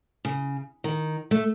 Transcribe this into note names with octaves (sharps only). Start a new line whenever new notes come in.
C#3
D#3
A3